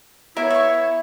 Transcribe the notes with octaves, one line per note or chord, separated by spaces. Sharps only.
B3 E4 A#4 C#5 E5
E5 C#6